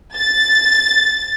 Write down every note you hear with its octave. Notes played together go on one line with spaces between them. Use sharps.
A6